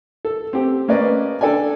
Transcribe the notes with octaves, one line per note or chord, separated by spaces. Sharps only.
A4
C4 G4
A#3 C#4 B4 D5 D#5
D4 A4 D5 G5 G#5